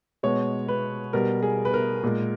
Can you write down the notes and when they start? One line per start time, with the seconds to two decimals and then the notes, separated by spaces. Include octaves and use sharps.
0.23 B2 G#3 C#5
0.68 B4
1.13 B2 G3 A#4
1.43 G#4
1.65 B4
1.74 A#4
2.03 A#2 G#3